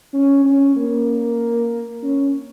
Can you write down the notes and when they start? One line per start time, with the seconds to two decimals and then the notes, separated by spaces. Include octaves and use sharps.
0.13 C#4
0.45 C#4
0.76 A#3
2.03 C#4